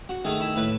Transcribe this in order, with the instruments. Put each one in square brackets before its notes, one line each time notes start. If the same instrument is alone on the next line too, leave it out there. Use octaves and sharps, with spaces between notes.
[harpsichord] F#4
D#3 A3 G#4
E4
A2 B4